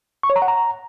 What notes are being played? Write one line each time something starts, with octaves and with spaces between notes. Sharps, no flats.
C#6
C#5
A#5
F#5
A#5